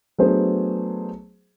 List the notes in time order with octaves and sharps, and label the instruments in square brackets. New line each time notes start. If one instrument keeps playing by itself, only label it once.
[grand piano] F#3 A3 B3 D4 G#4 C5